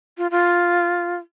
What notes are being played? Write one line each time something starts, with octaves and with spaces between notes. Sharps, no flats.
F4
F4